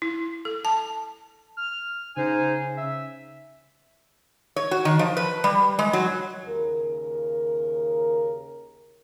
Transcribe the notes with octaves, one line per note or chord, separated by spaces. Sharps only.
E4
A4
A5
F6
C#3 D#4 C5 G#5
E5
C#5
F#4
D#3
F3
B4
G3
G#3
F#3
D#2 C#3 A#4